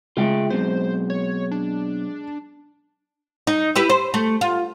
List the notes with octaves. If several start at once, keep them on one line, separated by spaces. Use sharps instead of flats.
C#3 G#3 F4 E5 G5
B2 F#3 C4 C5
C#5
D4
D#4
E4 G4 B4
C5
A3
F4